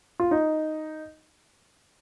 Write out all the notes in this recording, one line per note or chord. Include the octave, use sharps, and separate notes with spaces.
F4
D#4